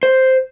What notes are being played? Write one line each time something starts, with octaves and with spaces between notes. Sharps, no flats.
C5